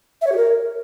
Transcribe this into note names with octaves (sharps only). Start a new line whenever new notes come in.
E5
C#5
G4
A#4